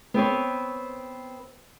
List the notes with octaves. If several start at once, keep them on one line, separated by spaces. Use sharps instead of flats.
B3 C4 B4 C#5